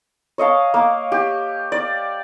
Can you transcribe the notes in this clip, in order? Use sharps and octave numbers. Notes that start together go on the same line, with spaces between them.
C#5 D#5 F5 A5
A#3
G4
D5